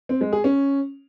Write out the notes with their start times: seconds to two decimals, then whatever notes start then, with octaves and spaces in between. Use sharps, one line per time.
0.09 C4
0.21 G#3
0.33 G#4
0.44 C#4